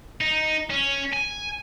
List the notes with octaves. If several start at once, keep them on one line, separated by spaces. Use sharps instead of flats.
D#4
C#4
G#5